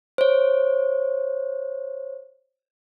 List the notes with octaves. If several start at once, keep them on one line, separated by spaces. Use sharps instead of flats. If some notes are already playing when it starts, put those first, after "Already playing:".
C5 C#5